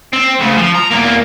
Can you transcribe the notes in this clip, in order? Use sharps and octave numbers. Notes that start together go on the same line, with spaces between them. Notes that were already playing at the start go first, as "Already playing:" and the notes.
C4
D2 C#3
F3
A#5
E2 A#3